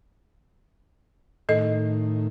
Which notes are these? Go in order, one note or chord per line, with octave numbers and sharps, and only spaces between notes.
A2 D#3 A4 D#5